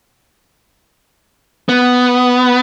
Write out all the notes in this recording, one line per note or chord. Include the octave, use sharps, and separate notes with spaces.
B3